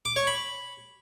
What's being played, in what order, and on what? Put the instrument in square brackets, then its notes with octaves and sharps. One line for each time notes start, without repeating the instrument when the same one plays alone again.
[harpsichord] D6
C#5
B5